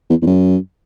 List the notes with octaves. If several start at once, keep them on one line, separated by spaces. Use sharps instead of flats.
E2
E2
F#2